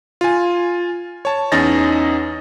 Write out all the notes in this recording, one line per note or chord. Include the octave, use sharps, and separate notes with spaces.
F4 G#5
C#5 A5
E2 C#4 D#4 D#5 A6 A#6